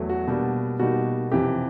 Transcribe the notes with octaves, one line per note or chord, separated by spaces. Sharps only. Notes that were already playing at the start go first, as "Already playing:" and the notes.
Already playing: E2 F#3 A3
F#4
B2 G3 A#3 D4
B2 G3 A#3 D#4 F#4
F2 C3 E3 G4